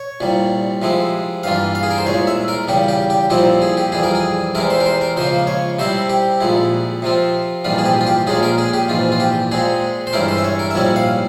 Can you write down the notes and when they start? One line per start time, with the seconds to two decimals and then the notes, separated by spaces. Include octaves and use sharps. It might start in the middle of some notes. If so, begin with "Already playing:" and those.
Already playing: C#5
0.20 C2 A#2 G3
0.82 C3 F3 G#3 E4
1.43 G2 E3 A#3 F4 F5
1.75 F5
1.83 G#4
1.90 A#4
1.98 C5
2.06 C2 A#2 G#3 C#5
2.27 E5
2.48 A#4
2.68 E2 C#3 G3 G4
2.88 G4
3.10 G4
3.30 C2 A#2 F3 C4 E4 G4
3.62 G#4
3.77 G4
3.92 F2 E3 G3 G#4
4.03 A#4
4.15 G#4
4.55 E2 C3 E3 G#3 E4 A#4
4.70 C5
4.80 A#4
4.86 C5
5.01 A#4
5.16 C#2 C#3 F3 A#3 C5
5.47 C#5
5.79 C3 G3 C4 E4 C5
6.09 G4
6.40 A#1 A#2 G#3 E4
7.02 C3 F3 C4 F4
7.64 A#1 G#2 E3 G3 F4
7.78 G#4
7.85 G4
8.01 F4
8.07 G4
8.27 A#1 A#2 G#3 C#4 G#4
8.43 A#4
8.58 G#4
8.74 G4
8.88 A#1 G#2 E3 F4
9.12 F4
9.20 G4
9.51 A#2 G#3 C4 G#4
10.07 C5
10.13 G2 E3 G#3 C#4 E4 A#4
10.28 C5
10.38 E5
10.44 C#5
10.59 A#4
10.71 E5
10.75 A#1 G#2 G3 C#4 E4 C#5
10.96 F5